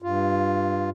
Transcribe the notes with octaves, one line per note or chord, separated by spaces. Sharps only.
G2 F4